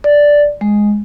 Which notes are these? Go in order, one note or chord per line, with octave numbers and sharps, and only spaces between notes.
D5
G#3